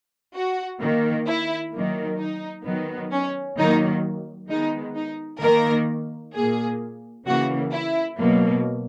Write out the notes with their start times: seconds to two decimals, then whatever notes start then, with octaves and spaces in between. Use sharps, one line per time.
0.35 F#4
0.81 D#3 A#3
1.27 E4
1.73 D#3 F#3 A#3
2.19 D#4
2.65 D#3 F#3 B3
3.12 C#4
3.58 D#3 F#3 A#3 D#4
4.50 D#3 G#3 B3 D#4
4.96 D#4
5.42 D#3 A#3 A#4
6.34 A#2 A#3 G#4
7.26 C#3 E3 A#3 F#4
7.72 E4
8.19 B2 F#3 A#3